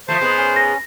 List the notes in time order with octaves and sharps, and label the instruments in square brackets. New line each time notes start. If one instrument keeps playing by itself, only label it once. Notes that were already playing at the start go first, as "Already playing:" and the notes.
[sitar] F3 A3 [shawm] C5
[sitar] G#2 G#3 B3
[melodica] C#4
[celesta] A#6